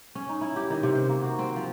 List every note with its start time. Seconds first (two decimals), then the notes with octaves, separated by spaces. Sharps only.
0.15 C#4
0.29 D#4
0.41 E4
0.56 G4
0.70 D#3
0.83 C3
0.95 C5
1.09 A#3
1.22 F#4
1.39 C4
1.56 F3